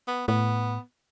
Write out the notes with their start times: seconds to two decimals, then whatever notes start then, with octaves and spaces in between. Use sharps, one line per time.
0.08 B3
0.28 A2 B3